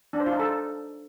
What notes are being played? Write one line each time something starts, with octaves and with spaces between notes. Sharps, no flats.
D4
C5
F4
D#4
A4